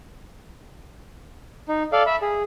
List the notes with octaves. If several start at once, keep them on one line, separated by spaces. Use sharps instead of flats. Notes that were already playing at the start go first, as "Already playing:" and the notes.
D#4
A4 D5 F5
E5 B5
G#4